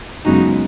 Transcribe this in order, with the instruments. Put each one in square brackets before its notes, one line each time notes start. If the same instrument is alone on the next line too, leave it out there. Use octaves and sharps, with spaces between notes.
[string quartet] F#2 C#3 G#3 B3 D#4 F#4